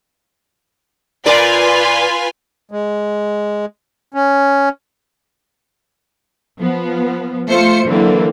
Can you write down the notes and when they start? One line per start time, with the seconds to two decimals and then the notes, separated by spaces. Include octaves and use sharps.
1.26 A#2 F4 A#4 B4 D5 G#5
2.72 G#3
4.14 C#4
6.60 F3 B3
7.48 A3 F4 C5 C#7
7.87 D3 E3 F#3 A#3 C4